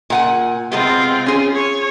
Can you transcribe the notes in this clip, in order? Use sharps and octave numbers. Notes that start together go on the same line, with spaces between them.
A#2 F#5 G#5
C3 G#3 B3 C4 F4
C#4 G#4
C#5